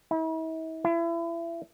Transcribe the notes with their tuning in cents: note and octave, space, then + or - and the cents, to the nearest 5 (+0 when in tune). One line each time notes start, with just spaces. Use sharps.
E4 -45
E4 +30